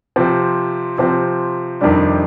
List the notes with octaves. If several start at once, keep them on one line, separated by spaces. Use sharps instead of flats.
C3 F3 C4
C3 F3 C4
F2 C3 D#3 G3 D4